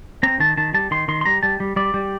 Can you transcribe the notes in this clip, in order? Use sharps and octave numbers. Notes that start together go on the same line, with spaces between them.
C4 A#5
D#3 A5
D#3 A5
G3 A5
D#3 C6
D#3 C6
C6
G3 A#5
G3 A5
G3
G3 D5
G3